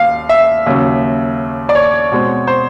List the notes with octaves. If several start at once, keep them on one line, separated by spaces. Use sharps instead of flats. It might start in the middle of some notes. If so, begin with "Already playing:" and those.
Already playing: D#2 F5
E5
D#2 C#3 F#3
D5
C#5
B2 G#3 C4
C5